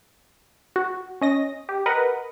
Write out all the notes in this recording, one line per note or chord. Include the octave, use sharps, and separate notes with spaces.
F#4
C#4 D#5 A#6
G4
A#4 B4 D#5 F#5